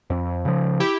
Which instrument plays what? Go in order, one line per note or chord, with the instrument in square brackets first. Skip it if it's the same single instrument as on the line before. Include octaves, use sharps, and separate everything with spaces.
[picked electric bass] F2
C#3 F3
[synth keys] E4 G4